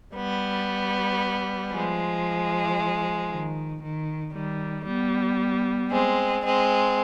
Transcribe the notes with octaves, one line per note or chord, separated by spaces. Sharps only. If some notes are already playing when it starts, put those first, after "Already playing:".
G3 B3
F3 G#3
D#3
D#3
D#3 G3
G3 B3
G#3 C4
G#3 C4